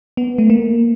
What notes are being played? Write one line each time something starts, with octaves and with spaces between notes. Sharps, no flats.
B3
A3
A#3